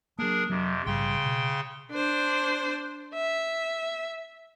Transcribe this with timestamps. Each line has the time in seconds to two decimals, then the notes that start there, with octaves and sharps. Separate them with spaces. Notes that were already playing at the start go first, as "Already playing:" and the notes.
0.19 F#3 A#3 D4 G#4 A#4
0.50 F2 C3 F#3
0.86 A#1 G#2 C#3 G3 G5 C6
1.26 B2
1.92 D4 C5
3.14 E5